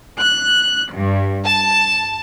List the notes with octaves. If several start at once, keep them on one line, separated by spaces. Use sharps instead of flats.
F#6
G2
A5